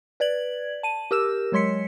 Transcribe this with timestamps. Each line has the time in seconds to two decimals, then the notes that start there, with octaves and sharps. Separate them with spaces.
0.20 B4 D5 G#6 F#7
0.83 A5 D#7
1.11 G4 A#4 E6 E7
1.52 F#3 G#3 C#5 C6 B6 C#7